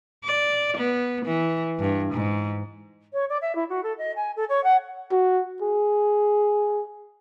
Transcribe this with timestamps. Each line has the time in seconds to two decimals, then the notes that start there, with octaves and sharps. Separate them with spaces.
0.24 D5
0.77 B3
1.25 E3
1.79 G2
2.14 G#2
3.13 C#5
3.29 D5
3.42 E5
3.55 E4
3.69 F#4
3.83 A4
3.98 D#5
4.16 G#5
4.36 A4
4.49 C#5
4.64 F#5
5.12 F#4
5.62 G#4